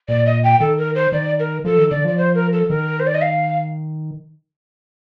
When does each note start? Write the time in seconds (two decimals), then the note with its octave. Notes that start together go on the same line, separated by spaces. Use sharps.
0.08 A#2 D5
0.26 D#5
0.44 G5
0.60 D#3 A4
0.78 A#4
0.95 C5
1.12 D#3 D5
1.39 A#4
1.65 F3 A4
1.78 D#3
1.91 D3 D5
2.05 F3 D5
2.18 C5
2.35 A#4
2.53 A4
2.70 D#3 A#4
3.00 C5
3.07 D5
3.15 D#5
3.22 F5